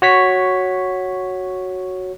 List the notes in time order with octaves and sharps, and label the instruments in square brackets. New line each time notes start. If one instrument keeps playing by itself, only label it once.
[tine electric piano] F#4 C#5 B6